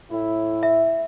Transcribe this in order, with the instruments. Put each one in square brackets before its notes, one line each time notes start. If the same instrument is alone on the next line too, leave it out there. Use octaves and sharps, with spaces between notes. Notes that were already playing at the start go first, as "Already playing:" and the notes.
[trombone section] A2 E4
[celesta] E5